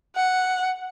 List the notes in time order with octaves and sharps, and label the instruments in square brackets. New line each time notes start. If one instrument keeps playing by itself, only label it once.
[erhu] F#5